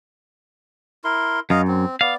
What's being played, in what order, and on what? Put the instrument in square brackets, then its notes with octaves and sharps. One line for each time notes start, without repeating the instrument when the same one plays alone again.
[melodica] E4 A#4 C6
[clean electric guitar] F#2 [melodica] D#5 F5 A#5
[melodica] C4
[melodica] B3 D5 [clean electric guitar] F5